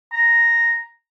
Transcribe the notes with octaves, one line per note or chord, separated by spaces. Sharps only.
A#5